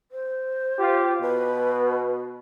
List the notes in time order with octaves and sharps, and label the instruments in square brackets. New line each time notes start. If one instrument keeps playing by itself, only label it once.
[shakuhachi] C5
[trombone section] F4 G4
[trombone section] B2 [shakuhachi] B4